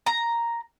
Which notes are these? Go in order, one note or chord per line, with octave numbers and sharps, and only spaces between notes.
A#5